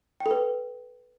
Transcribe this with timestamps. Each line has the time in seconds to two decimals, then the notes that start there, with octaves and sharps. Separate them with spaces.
0.20 G5
0.26 A4
0.31 B4